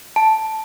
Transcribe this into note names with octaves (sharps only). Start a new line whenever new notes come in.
A5